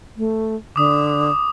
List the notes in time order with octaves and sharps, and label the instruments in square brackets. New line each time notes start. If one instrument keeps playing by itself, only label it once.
[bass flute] A3
[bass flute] D3 [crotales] D6 D#6